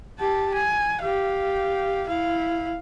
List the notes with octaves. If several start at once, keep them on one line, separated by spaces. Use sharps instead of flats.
G4 A5
G#5
G4 F5
E4 F5